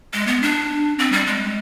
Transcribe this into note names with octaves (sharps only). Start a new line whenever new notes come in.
G#3
B3
D4
C4
G3
G#3